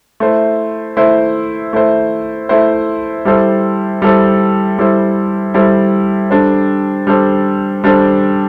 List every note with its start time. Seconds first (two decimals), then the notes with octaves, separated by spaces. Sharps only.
0.20 A3 E4 C5
0.97 A3 E4 C5
1.73 A3 E4 C5
2.49 A3 E4 C5
3.25 G3 E4 A4 C5
4.02 G3 E4 A4 C5
4.78 G3 E4 A4 C5
5.54 G3 E4 A4 C5
6.31 G3 D4 A4 C5
7.07 G3 D4 A4 C5
7.84 G3 D4 A4 C5